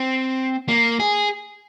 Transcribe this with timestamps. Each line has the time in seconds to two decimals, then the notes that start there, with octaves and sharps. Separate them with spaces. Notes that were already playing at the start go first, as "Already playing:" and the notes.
Already playing: C4
0.68 A#3
1.00 G#4